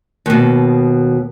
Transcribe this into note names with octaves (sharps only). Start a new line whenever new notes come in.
D#2 B2